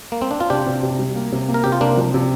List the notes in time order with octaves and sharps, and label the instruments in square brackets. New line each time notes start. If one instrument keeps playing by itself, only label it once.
[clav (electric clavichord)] A#3
C4
D4
F4
[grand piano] C3 [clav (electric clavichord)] D4 G4
[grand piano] C3
C3
G3
A#3
C3
A#3
[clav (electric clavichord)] A#4
[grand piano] C3 [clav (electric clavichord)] G4
[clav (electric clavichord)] F4
[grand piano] C3 [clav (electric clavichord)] A#3 D4
[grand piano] F3
C3